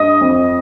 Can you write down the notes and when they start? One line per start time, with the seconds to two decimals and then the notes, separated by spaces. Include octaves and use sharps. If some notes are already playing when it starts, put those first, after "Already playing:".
Already playing: G2 D#5 D#6
0.21 F2